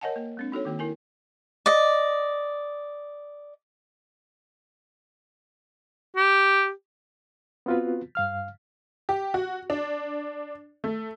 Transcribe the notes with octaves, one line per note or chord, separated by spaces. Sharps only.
A#4 C#5 D#5 F#5 G#5 A5
A#3
G#3 C4 D4
D#4 F#4 A4 C#5
D#3 A#3 F#4
E4 A#4 G#5
D5 D#5
G4
B3 C4 F4 F#4 B4
G2 F5 F6
G4
F#4
D4
A3